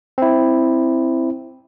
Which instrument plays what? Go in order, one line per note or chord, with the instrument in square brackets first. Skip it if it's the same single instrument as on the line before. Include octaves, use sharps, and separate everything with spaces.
[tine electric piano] C4 E4